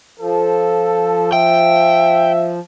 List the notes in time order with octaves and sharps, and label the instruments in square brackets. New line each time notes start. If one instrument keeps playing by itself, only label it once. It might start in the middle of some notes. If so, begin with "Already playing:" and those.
[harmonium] F3 [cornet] A4
[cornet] E5 [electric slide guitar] G5